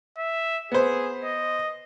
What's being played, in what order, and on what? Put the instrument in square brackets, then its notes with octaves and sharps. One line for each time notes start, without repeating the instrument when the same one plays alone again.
[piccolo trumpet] E5
[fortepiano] B3 C5 [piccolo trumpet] G#4
[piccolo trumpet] D#5